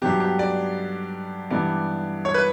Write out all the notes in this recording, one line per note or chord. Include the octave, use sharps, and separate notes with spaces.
G2 F#3 B3 G4
G4
D5
G2 E3 G3 B3 D5
C#5
B4